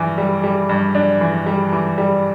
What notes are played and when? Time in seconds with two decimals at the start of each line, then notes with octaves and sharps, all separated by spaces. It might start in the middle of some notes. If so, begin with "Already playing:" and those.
Already playing: G2 E3
0.18 G3
0.44 G3
0.69 G2
0.95 D4
1.21 E3
1.46 G3
1.72 E3
1.98 G3